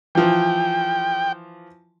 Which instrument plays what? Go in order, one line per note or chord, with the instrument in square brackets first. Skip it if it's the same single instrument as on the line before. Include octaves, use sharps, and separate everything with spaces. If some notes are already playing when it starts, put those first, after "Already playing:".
[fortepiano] E3 F3 [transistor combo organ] G5